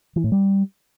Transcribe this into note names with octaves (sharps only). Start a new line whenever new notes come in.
E3
A2
G3